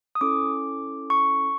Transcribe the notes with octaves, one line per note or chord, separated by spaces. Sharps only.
D#6
C#4 E4 A4 D6
C#6